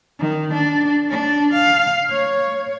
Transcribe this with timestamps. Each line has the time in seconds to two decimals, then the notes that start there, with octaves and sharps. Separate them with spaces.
0.20 D#3
0.53 D4
1.10 D4
1.53 F5
2.10 C#5